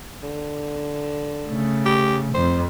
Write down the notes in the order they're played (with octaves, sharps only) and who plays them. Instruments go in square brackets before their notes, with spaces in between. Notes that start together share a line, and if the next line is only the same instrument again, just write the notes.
[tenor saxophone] D3
[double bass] C#3 A3
[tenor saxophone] G4
[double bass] F2 [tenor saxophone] C5